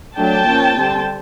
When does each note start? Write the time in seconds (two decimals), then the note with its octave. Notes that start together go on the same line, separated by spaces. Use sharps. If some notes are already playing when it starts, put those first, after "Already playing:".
0.17 F#3 A3 D4 G5 A5
0.46 F3 A#3 C#4
0.76 D3 G3 C4